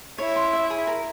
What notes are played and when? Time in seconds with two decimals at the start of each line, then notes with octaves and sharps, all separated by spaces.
0.18 E4 C#5
0.36 C6
0.53 E5
0.70 G#4
0.87 A#4